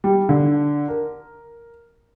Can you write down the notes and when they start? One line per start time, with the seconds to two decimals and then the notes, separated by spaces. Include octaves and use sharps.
0.04 G3
0.29 D3
0.88 A#4